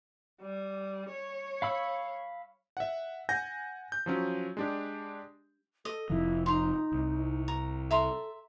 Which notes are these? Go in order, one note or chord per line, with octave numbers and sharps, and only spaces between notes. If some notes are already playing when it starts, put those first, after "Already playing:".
G3
C#5
F5 B5 E6
E5 F#5
F#5 G#5 G6 A#6
G6
F3 F#3 C#4
G#3 D4 G4
A4 D#5
F1 F3 E4
D#4 A#5 C6
C2
A#5
A4 E5 A#5 C6